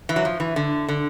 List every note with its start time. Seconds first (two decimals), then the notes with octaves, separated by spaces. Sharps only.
0.09 E3
0.16 F#3
0.25 F3
0.40 E3
0.56 D3
0.88 D3